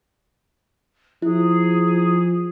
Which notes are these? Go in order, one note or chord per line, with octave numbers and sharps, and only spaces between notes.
F3 E4 G#4